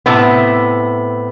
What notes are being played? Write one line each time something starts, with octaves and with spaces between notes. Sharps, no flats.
A2 C3 A3 B3